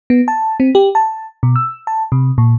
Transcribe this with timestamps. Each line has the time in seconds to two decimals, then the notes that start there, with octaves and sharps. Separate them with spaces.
0.10 B3
0.28 A5
0.60 C4
0.75 G4
0.95 A5
1.43 B2
1.56 E6
1.87 A5
2.12 C3
2.38 A#2